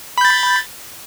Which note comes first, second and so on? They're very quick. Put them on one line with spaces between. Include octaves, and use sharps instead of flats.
B5 G6 A6